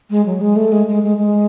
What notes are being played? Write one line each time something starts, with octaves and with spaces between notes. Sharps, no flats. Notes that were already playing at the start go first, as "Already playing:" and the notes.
G#3
F#3
G#3
A3
G#3
G#3
G#3
G#3